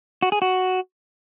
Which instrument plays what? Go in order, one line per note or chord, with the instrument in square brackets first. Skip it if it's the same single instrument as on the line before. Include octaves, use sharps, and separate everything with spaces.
[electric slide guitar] F#4
G#4
F#4